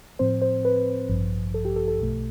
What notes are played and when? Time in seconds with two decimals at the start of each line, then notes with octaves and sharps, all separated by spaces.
0.19 A2 F3 C4 C5
0.42 C5
0.65 B4
1.09 A1 G2 F3
1.54 A4
1.65 G4
1.76 A4
1.88 A4
1.99 B1 B2 A3